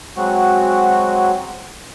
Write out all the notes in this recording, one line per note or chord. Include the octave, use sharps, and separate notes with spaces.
F#3 G#3 C4 F#4